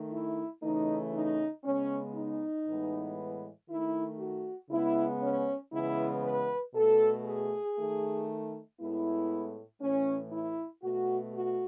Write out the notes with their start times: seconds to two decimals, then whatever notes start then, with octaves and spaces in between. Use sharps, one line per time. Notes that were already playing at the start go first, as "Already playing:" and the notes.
Already playing: D#3 A3
0.12 E4
0.62 C#3 E3 A3 D#4
1.14 D#4
1.64 C#3 G#3 B3 C#4
2.15 D#4
2.67 A2 E3 G#3 B3
3.69 D#3 A3 E4
4.19 F#4
4.70 C#3 G#3 B3 E4
5.21 C#4
5.72 C#3 E3 G#3 B3 E4
6.24 B4
6.74 B2 A3 A4
7.25 G#4
7.77 D#3 A3
8.79 A2 G#3 B3 E4
9.80 A2 E3 A3 C#4
10.32 E4
10.82 B2 A3 F#4
11.34 F#4